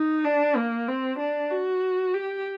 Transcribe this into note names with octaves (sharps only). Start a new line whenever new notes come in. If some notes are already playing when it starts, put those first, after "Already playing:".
Already playing: D#4
D4
A#3
C4
D4
F#4
G4